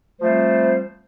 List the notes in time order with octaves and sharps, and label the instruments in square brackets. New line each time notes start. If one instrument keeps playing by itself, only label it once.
[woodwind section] F3 G3 A3 C4 C5